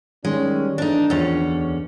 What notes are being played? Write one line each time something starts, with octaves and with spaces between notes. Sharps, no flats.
D#3 G3 G#3 C#4
E2 A2 D4 D#4
E2 D#3 F3 C#4
D2